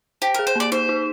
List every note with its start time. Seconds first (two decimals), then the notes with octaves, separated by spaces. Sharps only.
0.22 G4 C5
0.34 G#4 A#4
0.47 C5
0.55 A#3 D5
0.72 D#4 C5
0.89 D#4